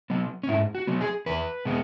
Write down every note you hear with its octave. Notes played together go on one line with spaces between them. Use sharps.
F#3 B3
C#4
G#2 E4
F#4
F#3 B3
G#4
E2 B4
B2 G#3 B3